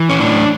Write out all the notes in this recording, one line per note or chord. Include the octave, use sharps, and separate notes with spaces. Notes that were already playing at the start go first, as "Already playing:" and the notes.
Already playing: E3
C#4
A2 D4